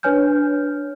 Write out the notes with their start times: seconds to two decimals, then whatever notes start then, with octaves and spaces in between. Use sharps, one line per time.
0.03 D4 B4 C#5 G#5 F6 G6